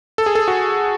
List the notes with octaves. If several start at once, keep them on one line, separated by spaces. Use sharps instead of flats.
A4
G#4
A4
F#4